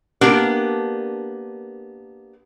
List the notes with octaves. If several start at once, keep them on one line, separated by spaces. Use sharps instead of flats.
A#3 B3 D4 G4 A#4